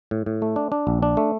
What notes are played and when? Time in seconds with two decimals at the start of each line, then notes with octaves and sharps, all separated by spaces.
0.11 A2
0.26 A2
0.42 A3
0.56 D4
0.72 D4
0.87 A#1
1.03 D4
1.17 A3